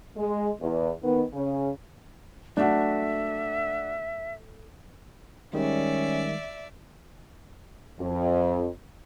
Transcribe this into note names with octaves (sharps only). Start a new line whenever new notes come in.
G#3
E2
D#3 B3
C#3
A3 D4 F#4 E5
D#3 G3 G#3 C#4 D5 E5
F2